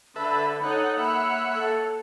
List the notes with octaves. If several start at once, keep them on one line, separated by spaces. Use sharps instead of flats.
D3 A4 B4 E5 B5
D#4 A4 C#5 F#5
A#3 C#5 E5 F#5 B5
A4